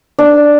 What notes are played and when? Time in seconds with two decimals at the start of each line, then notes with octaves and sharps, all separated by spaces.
0.19 D4